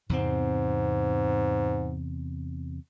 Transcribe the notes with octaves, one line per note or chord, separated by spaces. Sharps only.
E2 G#2 C3 C4